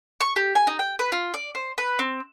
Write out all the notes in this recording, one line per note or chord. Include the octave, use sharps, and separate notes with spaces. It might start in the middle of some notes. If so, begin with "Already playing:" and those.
C#6
G4
G#5
D#4
G5
B4
F4
D5
C5
B4
C4